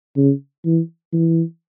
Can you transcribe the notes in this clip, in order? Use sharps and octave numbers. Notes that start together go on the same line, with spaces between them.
C#3
E3
E3